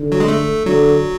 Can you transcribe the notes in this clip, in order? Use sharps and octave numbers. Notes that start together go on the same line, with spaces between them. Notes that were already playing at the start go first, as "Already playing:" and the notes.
Already playing: D3
F#3
G#3
A3
D3 F#3